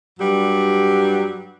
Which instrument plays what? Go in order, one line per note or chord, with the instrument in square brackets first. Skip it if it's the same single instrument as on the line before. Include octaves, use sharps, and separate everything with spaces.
[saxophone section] G2 F#3 G3